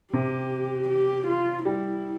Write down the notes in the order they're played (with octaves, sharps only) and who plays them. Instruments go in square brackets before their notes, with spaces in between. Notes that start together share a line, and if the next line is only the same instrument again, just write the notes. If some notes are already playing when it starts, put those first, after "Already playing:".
[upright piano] C3 [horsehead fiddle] G4
[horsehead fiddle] G4
F4
[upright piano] G3 [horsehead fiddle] E4